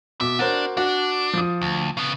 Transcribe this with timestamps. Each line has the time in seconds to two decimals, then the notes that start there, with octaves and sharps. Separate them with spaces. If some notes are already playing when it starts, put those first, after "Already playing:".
0.21 B2 E5 D6
0.39 D4 F#4 A#4 C5
0.77 D4 F#4
1.34 F3 D#6
1.62 D2
1.97 C#3 B3